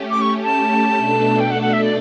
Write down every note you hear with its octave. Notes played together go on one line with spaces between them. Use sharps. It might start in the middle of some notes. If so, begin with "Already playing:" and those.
Already playing: A3 C#4 G4
D6
C#6
A5
B2 A3 D4 A4
G5
F#5
F#5
E5
D5